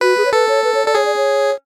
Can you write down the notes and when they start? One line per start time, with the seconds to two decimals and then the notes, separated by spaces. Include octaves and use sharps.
0.01 F#4 B4
0.17 G#4
0.25 C#5
0.33 A4 B4
0.49 C#5
0.64 B4
0.74 C#5
0.85 A4 D5
0.95 G#4 C#5
1.06 D5
1.16 C#5